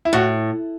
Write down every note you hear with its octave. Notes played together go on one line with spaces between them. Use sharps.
E4
A2 F#4